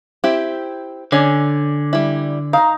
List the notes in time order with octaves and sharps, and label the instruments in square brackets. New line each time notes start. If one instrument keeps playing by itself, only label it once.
[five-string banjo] C4 E4 G4
[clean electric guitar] D3 [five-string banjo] C#4 [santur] D5 G#5
[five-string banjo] G3 E4
[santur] D#4 A#5 [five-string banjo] F5